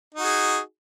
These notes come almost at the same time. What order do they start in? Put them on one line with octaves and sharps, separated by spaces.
D#4 F#4 G#4